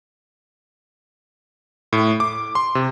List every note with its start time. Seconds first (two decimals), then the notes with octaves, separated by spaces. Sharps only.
1.93 A2
2.20 D6
2.55 C6
2.75 C3